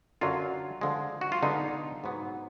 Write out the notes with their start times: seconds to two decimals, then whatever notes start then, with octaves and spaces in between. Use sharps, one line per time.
0.21 F#2 D3 F#3 F4
0.81 D3 F3 G#3
1.21 F#4
1.32 F4
1.43 D3 G#3 B3 D#4
2.04 G#2 F#3 B3